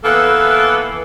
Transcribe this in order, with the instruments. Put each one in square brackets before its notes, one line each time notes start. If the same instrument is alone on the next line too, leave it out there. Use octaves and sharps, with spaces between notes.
[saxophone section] E3 A#3 B3 A4